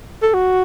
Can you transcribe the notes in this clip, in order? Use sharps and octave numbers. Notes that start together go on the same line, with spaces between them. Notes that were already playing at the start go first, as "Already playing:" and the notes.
A4
F#4